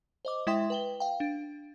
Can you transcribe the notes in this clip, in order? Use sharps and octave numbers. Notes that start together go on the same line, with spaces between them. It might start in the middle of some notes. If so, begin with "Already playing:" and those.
C5 D#5 D6
G#3 E4 E5 G5 C6 G#6
B4 G5 G7
F5 G5
D4